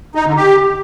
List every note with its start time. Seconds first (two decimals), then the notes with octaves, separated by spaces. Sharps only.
0.15 D#4
0.26 D3
0.37 G4